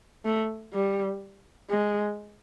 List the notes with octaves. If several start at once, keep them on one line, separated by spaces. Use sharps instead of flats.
A3
G3
G#3